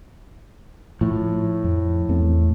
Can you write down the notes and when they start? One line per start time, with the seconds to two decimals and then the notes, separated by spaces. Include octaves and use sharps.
1.01 A2 F3
1.64 F2
2.09 E2 A3 C4